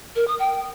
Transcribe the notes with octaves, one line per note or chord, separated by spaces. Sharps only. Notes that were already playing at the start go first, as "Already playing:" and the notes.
A#4
D#6
G5